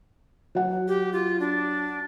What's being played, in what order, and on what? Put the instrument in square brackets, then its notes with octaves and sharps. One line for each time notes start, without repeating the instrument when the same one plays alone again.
[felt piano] F#3 F#5
[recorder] G4
F4
D4